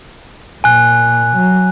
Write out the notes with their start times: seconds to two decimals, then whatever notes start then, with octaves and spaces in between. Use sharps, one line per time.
0.64 A#2 G#5 F#6
1.37 F#3